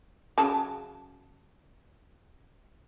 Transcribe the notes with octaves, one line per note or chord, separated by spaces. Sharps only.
C#3 F#3 A5